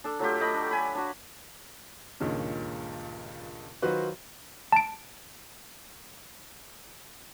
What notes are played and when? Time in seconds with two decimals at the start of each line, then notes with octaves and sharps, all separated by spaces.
0.04 D4 A4
0.19 F#3 A3 F4 G4
0.40 A3 D#5 B5
0.54 D4
0.71 G#5 B5
0.95 D4 F#4
2.20 C#2 G2 A#2 D#3 G#3 C#4
3.82 D#3 F#3 F4 F#4 B4 C5
4.72 A5 D7